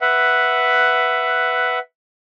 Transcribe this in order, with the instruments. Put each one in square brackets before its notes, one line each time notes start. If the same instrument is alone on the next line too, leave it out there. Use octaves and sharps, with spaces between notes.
[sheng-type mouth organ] B4 E5 F#5